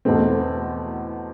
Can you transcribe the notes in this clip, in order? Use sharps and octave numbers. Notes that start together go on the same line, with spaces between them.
E2 B2 A3 C4